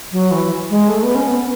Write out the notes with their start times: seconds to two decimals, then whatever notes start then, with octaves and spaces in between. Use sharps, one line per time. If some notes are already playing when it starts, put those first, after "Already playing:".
0.12 F#3
0.31 E3
0.70 G#3
0.89 A3
1.03 B3
1.15 C#4
1.28 B3